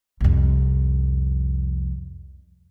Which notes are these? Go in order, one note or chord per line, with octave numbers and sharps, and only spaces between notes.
C2 F2